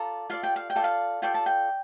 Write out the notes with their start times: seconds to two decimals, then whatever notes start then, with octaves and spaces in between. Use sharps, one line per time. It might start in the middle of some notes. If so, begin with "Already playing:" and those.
Already playing: F4 A4 D5 A#5
0.30 F4 A4 D5 F5
0.43 G5
0.56 F5
0.70 G5
0.76 F4 A4 D5
0.84 F5
1.22 F4 A4 D5 G5
1.34 A5
1.46 G5